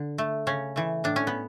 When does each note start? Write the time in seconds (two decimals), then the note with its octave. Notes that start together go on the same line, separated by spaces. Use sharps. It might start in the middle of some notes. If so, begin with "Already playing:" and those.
Already playing: D3
0.18 A3
0.47 C#3 C#4
0.76 E3 A3
1.04 A2 D4
1.16 C#4
1.27 B3